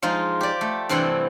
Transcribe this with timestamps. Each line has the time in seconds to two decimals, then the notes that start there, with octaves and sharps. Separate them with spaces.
0.02 F3 G#3 D#4 F4
0.41 G4 D5
0.61 A3
0.89 G2 C3 E3 C4 E4 F#5